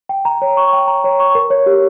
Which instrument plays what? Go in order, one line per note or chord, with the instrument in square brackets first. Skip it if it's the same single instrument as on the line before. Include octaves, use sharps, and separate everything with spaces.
[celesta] G5
A#5
C#5
C#6
G5
A#5
C#5
C#6
A#4
C#5
G4